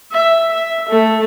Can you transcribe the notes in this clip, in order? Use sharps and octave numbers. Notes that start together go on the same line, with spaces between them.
E5
E5
A3